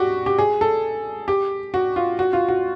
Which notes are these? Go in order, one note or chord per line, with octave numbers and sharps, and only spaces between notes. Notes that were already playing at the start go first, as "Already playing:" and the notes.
Already playing: F#4 G4
G4
G#4
A4
G4
F#4
F4
F#4
F4
F#4